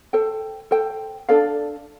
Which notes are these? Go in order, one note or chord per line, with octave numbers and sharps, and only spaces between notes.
A4 C5 G5
A4 C5 G5
D4 A4 D5 F5